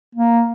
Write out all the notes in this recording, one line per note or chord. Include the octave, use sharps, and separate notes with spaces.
A#3